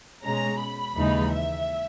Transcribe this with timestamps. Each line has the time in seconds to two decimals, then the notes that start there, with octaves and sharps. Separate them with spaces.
0.24 B2 G#3 C#4 A#5
0.60 B5
0.95 D#2 C#3 E3 G#3 D#4
1.32 E5